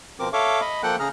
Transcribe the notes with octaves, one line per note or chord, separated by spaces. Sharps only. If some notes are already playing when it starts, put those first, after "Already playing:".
B2 F3 C4 A#4 D6
A4 C#5 E5 F5 C#6 D6
D#5 B5
F3 A#3 A4 F#5 G5 F#6
C#3 G#4 A#5 F6